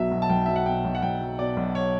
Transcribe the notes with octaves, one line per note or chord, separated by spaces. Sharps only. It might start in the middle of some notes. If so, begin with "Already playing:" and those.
Already playing: B1 B2 F#3 E5
B1
A5
B1 G5
F#3 E5
F#5
B2 G5
B1
F#5
B1 G5
F#3
B2 D5
B1
C#5